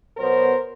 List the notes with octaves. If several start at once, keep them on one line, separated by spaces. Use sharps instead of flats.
B2 F#3 B3 A#4 C5